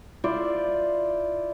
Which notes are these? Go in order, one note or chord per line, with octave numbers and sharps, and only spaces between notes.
E4 F4 C5 D5